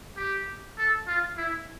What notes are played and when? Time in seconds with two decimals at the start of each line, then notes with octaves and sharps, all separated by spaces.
0.17 G4
0.78 A4
1.07 F4
1.38 E4